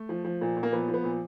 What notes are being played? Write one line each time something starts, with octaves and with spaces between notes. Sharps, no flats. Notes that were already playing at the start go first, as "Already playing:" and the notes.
Already playing: A3
F3
F3
A#2
A#2
A#3
F3 B3
F3
B3
A#2